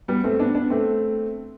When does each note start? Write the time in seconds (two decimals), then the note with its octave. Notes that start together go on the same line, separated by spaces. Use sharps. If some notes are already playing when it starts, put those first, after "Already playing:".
0.08 G3 B3
0.24 A3 C4
0.40 B3 D4
0.55 B3 D4
0.70 A3 C4